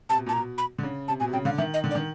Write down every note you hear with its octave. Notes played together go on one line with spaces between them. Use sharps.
C3 A5
B2
A#2 A5
A#5
B2
B5
D3
C#3
C3 A5
B2 G#5
C3
C#3 G5
D3 F5
D#3 E5
D#5
D3
D5
D#3